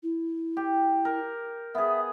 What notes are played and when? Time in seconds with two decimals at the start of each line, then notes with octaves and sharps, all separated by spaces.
0.03 E4
0.57 G4
1.05 A#4
1.75 B3 G#4 E5